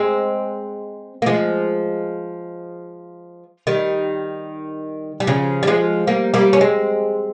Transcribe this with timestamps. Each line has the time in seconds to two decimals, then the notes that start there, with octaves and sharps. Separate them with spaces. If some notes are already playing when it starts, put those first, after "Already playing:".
Already playing: G#3 C4
1.22 A#3
1.26 F3 G#3
3.67 D#3 G3
5.20 G3
5.27 C#3 F3
5.63 G3
5.67 F3 G#3
6.07 G3 A#3
6.34 G3 A#3
6.53 C#4
6.61 G#3 C4